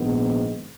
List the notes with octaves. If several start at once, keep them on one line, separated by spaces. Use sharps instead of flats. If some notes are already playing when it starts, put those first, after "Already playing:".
Already playing: A#1 G#2 D#3 B3